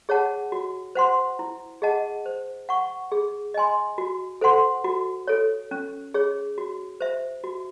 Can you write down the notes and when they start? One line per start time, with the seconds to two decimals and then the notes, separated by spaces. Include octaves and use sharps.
0.09 G#4 C#5 F#5 A5
0.52 F#4
0.95 C5 F#5 C6
1.39 E4
1.82 G#4 D#5 F#5 A5
2.26 C5
2.69 F#5 C#6
3.12 G#4
3.54 D#5 G#5 C6
3.98 F#4
4.41 A4 C5 F#5 C6
4.84 F#4
5.27 A4 C#5
5.71 C#4
6.14 G#4 C#5
6.58 F#4
7.01 C5 E5
7.44 F#4